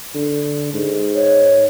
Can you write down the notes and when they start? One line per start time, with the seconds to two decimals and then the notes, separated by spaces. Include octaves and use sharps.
0.14 D3
0.73 G#2
1.15 C#5